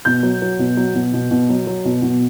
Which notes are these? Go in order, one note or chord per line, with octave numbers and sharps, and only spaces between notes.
B2 G6
F#3
F#3
B2
F#3
B2
B2
B2
F#3
F#3
B2
B2